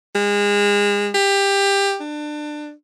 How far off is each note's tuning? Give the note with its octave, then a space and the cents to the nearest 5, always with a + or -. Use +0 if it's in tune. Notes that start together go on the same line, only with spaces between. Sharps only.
G#3 -30
G4 +20
D4 +25